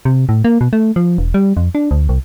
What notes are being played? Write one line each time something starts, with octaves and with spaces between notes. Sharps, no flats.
C3
A2
A#3
B2
A3
F3
E1
G3
F2
D4
D2
C2